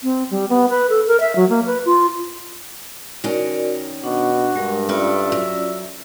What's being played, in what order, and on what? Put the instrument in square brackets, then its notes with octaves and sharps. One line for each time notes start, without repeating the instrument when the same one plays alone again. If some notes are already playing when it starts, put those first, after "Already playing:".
[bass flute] C4
G3
B3
B4
A4
A#4
E5
F#3
A#3
B4
F4
[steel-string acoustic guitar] D#3 C#4 [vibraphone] F#4 A#4 D5
[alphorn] B2 [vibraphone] D4 [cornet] F#4
[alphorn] G2 [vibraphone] G#3 A#4
[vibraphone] C#4 F4 D5 [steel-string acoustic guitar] A4 B4 [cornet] E5
[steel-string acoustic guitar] F#3